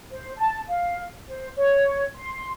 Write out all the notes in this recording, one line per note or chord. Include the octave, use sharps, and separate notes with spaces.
C5
A5
F5
C5
C#5
C6